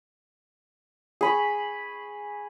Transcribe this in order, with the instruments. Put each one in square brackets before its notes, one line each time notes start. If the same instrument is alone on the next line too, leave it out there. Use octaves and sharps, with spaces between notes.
[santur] G#4 B5 C#6